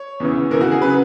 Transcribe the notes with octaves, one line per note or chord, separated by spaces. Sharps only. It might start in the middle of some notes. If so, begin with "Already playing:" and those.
Already playing: C#5
E2 C#3 E3
E2 C#3 E3 A#4
F#4
G#4
C#3 F#3 B4